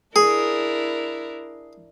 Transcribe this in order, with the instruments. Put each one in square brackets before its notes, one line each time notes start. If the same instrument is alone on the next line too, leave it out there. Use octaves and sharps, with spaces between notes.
[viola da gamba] D4 E4 A#4 [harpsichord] G#4